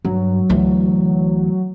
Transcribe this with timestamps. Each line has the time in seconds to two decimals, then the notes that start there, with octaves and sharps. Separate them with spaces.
0.05 G2 F#3
0.50 D2 E3